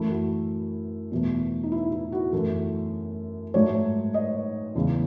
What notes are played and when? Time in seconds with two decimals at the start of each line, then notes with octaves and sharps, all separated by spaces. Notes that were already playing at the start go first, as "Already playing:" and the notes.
Already playing: F#2 E3 A3 E4
0.10 F#4
1.11 E2 B2 F#3 A3
1.63 D#4
1.72 E4
1.92 E4
2.12 F#4
2.32 F#2 E3 A3 A4
3.54 G#2 F#3 A3 C#5
4.14 D#5
4.75 E2 C#3 G#3